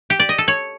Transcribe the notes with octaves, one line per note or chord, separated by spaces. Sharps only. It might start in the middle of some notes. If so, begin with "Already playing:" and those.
G4
D5
D#5
A4
C#5